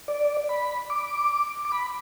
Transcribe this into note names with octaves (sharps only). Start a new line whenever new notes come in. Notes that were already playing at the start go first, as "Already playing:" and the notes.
D5
B5
D6
D6
B5